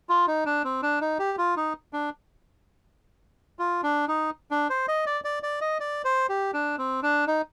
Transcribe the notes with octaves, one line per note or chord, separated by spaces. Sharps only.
F4
D#4
D4
C4
D4
D#4
G4
F4
D#4
D4
F4
D4
D#4
D4
C5
D#5
D5
D5
D5
D#5
D5
C5
G4
D4
C4
D4
D#4